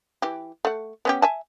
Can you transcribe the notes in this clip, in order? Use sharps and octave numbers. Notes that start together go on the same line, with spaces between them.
E3 G4
A3 F#5
B3 C#4 G4
E5 G#5 A5